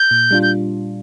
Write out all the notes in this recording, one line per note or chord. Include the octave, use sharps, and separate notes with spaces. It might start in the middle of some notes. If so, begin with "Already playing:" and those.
Already playing: G6
A#2
G3 D4 F4
G6